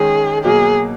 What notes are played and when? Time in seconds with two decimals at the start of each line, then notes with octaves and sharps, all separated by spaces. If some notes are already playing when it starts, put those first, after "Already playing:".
Already playing: D#3 G#3 C#4 G#4
0.44 B2 F#3 A#3 G#4